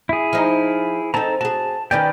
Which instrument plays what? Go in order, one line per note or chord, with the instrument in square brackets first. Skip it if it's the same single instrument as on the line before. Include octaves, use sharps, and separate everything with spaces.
[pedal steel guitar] E4 G#4
[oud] F3 D#4
[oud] C4 D#4 [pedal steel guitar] A4 A5 A#5
[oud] F#4 G#4 [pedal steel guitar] A5
[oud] D#3 C#4 G4 [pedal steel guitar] B4 D5 G5